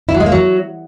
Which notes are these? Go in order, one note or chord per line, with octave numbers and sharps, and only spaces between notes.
E4
F#3
G#3
A#3
F#3